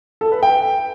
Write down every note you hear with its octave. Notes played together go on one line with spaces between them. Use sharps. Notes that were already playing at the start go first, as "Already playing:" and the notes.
A4
B4
G5